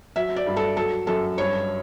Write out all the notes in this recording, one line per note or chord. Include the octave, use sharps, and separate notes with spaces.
F#3 E5
D5
G2
A4
F#3 A4
F#2 A4
G2 C#5